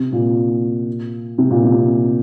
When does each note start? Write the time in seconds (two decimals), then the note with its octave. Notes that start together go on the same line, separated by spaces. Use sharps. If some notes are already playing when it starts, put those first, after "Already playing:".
Already playing: C3
0.12 A#2
1.38 C3
1.51 A#2
1.64 C3